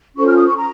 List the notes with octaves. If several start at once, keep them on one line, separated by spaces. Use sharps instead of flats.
C#4 F4 A4 C5 C#6
F6
D#6
C#6
A#5